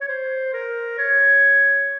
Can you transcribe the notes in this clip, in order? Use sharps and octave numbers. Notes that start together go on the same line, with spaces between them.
C#5
C5
A#4
C#5